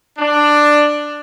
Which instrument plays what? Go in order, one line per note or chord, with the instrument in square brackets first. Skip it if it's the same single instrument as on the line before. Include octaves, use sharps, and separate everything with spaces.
[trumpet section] D4